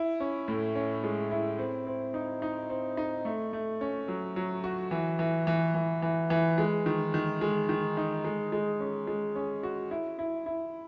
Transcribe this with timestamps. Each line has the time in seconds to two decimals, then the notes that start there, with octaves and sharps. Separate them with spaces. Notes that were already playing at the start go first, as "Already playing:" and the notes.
Already playing: E4
0.20 C#4
0.48 A2
0.75 C#4
1.04 G#3
1.31 E4
1.59 C4
1.87 C4
2.14 D#4
2.42 D#4
2.70 C4
2.97 D#4
3.25 A3
3.53 A3
3.81 C#4
4.08 F#3
4.36 F#3
4.64 F#4
4.91 E3
5.19 E3
5.47 E3
5.74 E3
6.02 E3
6.30 E3
6.58 G#3
6.86 D#3
7.14 D#3
7.41 G#3
7.69 D#3
7.97 D#4
8.24 G#3
8.52 G#3
8.80 C#4
9.07 G#3
9.35 C#4
9.63 F#4
9.91 E4
10.19 E4
10.46 E4